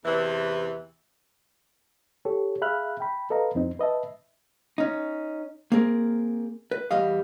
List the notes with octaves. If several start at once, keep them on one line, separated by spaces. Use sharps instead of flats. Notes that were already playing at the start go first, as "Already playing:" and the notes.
E2 C3 E3
G4 A4 C#5
G#4 E5 F5 B5 F6 F#6
G5 B5
A4 B4 D#5 F5 A#5
F2 C4 D#4
B4 D#5 E5 A5
C#4 D#4
A#3 C4 G#4 A#4
B4
E2 G3 D#5 F5